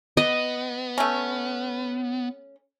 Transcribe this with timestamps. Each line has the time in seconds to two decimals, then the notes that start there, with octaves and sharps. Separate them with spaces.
0.17 B3 D#5
0.98 A3 C#4